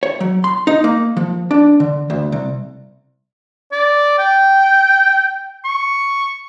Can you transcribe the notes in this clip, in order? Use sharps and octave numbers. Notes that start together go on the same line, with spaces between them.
C#5
F#3
C6
D#4
A#3
F3
D4
D3
D2
C2
D5
G5
C#6